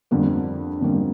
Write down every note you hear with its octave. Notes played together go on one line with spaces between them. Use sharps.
F2 D3 G3 A#3
F2 D3 G3 A#3